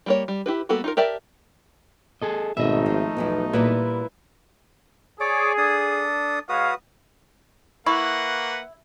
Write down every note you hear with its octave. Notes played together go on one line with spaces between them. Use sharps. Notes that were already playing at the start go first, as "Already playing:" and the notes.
G3 A#3 C#5
G3
E4 G4 B4
G3 A#3 B3 F#4 A4
D#4 F4 A#4
G4 A#4 D5 E5 A5
G#4 A4 D#5
G#1 B2 A3 D#4 D#5 E5
F3
B1 E2 F3 B3
A#2 G3 E4 B4 E5
G#4 C#5 D5 D6
D4 A4 D#6
G#3 F#4 B4 C#5 F5 D#6
A#3 E4 B4 F#5 C#6